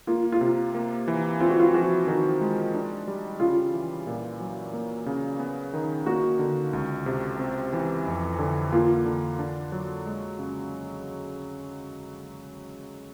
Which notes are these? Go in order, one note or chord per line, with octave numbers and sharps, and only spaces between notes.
A#3 F4
F4
C3
A#3
E3
C4 F4
F#4
F4
F3 F#4
D#3 F#4
G#3
D4
G3
C#3 F4
E3
A#2
F#3
A#3
C#3
B3
D#3
A#3 F#4
D3
C#2
C3
C4
E3
F2
D3
A#3 F4
D3
D4
F#3
G#3
C#3